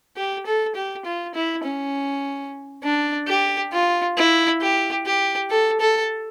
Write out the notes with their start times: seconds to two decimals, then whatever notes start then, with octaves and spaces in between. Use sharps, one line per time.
0.17 G4
0.46 A4
0.75 G4
1.06 F4
1.35 E4
1.65 C#4
2.83 D4
3.28 G4
3.73 F4
4.17 E4
4.61 G4
5.06 G4
5.50 A4
5.80 A4